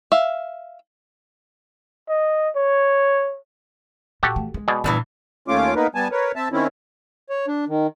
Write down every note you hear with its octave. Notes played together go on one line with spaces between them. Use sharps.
E5 F5
D#5
C#5
A#2 F#4 G4 A4
E3 A3
G#3
B2 G#4 D5
E2 G2 A#2 E3
D#2 A3 C#4 F4 D6
A#3 B3 D#4 A#4 B4
G3 B3 G#5 A5
A#4 B4 C#5
C4 E5 A5
D#3 C4 C#4 E4
C#5
D4
D#3